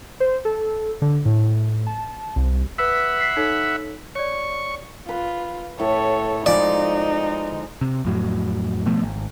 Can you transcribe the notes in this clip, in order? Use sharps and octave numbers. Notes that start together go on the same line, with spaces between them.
C5
A4
D3
A2
A5
C2
B4 E5 F#5 B5 E6
B6 C7
D#4 A4 C#5
C#5 D5 C#6
F4 B4
A2 A4 C#5
F3 G#3 D#4 D5
C3
F2 A2 F#3
B2 F3 A3 B3
G#1